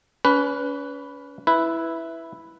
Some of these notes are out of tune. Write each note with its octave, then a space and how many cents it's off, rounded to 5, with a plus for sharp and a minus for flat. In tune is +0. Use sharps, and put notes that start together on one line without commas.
C#4 +35 B4 +0
E4 +0 B4 +0